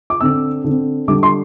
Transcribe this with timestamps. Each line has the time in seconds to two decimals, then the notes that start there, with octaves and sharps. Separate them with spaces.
0.10 D6
0.21 D3 C4 E6
0.64 D3 C4
1.08 D3 G3 D4 D6
1.23 C6